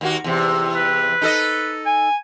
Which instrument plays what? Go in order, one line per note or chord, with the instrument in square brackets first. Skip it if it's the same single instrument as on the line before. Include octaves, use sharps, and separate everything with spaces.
[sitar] D#2 A#3 F#4
E2 C3
[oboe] B4
[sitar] D#4 A4 D#5
[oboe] G#5